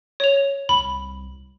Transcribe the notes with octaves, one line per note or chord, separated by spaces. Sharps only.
C#5 F7
C2 B5